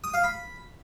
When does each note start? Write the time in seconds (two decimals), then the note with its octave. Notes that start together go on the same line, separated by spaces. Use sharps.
0.04 D#6
0.14 F5
0.24 B5